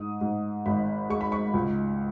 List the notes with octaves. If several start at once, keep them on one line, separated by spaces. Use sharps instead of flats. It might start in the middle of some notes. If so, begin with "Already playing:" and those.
Already playing: G#2 D#6
G#2
G#1 B5
G#3 C#6
B5
C#6
C#2